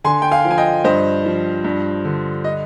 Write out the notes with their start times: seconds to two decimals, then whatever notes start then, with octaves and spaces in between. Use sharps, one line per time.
0.04 D3 G#5 C6
0.22 G5
0.31 F5 G#5
0.45 F3
0.51 G#5
0.58 D#5 G5
0.84 G2 C5 D#5
1.25 F3
1.64 G2
2.05 D3
2.44 D#5